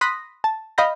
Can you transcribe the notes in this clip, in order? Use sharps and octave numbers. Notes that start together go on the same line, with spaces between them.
B5 C6 D#6 F#6 A#6 B6
A5
D#5 F5 B5 G6 A#6